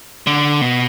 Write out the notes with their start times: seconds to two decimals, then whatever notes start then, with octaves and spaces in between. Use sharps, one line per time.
0.27 D3
0.61 B2